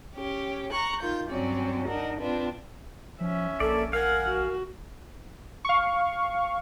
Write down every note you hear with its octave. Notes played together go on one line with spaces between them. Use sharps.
C#4 G4
A#5 C#6 F#6
D#3 F4 G6
G2 F#3 C4 C#4 D5
D4 D#4 A#4 F#5
C4 D4 F4 B4
F3 C#4 E5
A#1 A#3 A4 D5
A#4 F5 F#5 G#5
F#4
F5 C#6